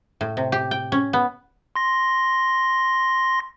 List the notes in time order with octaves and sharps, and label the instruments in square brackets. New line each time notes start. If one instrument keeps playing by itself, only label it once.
[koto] A2
C3
G4
G5
C#4
B3
[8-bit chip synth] C6 A#6